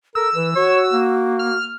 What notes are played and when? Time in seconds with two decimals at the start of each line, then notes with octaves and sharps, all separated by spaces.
0.15 A4 A#4 E6
0.35 E3 B4
0.56 F#4 C#5
0.93 A#3
1.39 F6